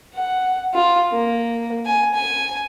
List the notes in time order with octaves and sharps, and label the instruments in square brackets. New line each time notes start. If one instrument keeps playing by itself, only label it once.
[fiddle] F#5
F4
A#3
G#5
G#5